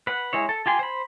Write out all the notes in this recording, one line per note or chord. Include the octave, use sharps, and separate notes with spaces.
B4 F#5
G#3 E4 C#5
A4
F4 G4 G#5 C6
C5 B5